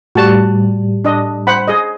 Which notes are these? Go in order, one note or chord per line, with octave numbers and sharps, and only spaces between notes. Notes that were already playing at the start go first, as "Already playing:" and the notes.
A2 G3 F#4 A5
D4 D#5
C5 F#5 B5
G#4 D#5